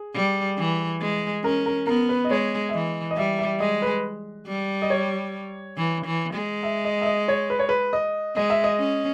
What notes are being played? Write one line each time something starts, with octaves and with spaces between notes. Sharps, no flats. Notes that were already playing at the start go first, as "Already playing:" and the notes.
Already playing: G#4
G3
E3
G#3
C#4 A#4
A#4
B3 A#4
B4
D#5
G#3 C#5
E5
E3 D#5
D#5
G3 E5
E5
G#3 D#5
B4
G3
D#5
C#5
E3
E3
G#3
E5
D#5
E5
D#5
C#5
B4
C#5
B4
D#5
G#3 D#5
E5
D#5
C#4